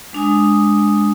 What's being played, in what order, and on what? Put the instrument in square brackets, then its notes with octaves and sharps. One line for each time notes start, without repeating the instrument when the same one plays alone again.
[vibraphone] G#3 D4 G#5 D#6